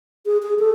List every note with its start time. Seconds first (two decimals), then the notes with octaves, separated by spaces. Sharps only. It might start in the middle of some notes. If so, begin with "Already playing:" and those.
0.26 G#4
0.42 G#4
0.59 A4